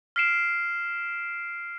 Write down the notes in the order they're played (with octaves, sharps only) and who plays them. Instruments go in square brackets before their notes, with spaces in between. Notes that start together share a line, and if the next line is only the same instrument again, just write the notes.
[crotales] F6 B6 C7 D7 E7